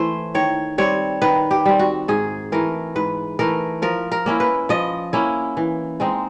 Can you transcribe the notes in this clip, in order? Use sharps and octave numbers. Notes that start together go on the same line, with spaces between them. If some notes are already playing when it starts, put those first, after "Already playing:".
Already playing: E3 A3 C5
D#3 C#5
G3 C4 C#5
D#3 B4
G4
G3 C4
F#4
G#2 G#4
E3 A3 A#4
G#2 B4
E3 A3 A#4
F3 A#4
A#4
A#3 C#4 E4
B4
F3 D#5
A#3 C#4 E4
E3
G#3 C4 D#4